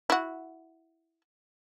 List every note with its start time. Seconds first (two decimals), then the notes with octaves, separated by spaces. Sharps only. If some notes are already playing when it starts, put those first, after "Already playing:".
0.10 E4 F#4